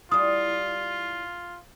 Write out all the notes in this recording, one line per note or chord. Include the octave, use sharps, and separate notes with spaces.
G3 E4 F4 D#6